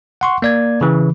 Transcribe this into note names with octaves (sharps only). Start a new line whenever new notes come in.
F#5 C6 C#6
A#3 D5 G#6
C#3 E3